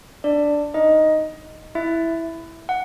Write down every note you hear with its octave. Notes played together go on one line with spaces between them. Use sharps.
D4 D5
D#4 D#5
E4 E5
F#5